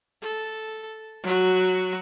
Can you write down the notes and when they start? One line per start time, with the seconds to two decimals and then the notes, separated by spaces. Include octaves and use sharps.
0.22 A4
1.23 F#3 F#4